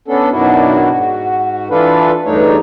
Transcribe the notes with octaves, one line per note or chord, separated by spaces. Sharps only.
B3 C#4 D4 A4
F#2 B2 D#3 D4 E4 F#4
G#2 F#4
E3 D4 F4 A4 B4
E2 G2 A3 D4 D#4 C#5